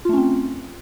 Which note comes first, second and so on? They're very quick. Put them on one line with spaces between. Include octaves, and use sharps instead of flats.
F4 A3 C#4 C4